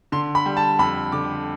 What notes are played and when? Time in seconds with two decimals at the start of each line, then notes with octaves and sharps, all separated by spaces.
0.12 D3 C6
0.35 B5
0.46 G3
0.57 A5
0.79 F2 B5
1.12 D3 D6